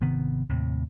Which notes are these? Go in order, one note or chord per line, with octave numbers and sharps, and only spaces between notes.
G#1 C3 D#3 B3
D#2 A2 C3